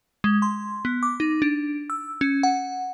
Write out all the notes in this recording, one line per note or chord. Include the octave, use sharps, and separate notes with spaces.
G#3
C6
B3
D6
D#4
D4
E6
C#4
F#5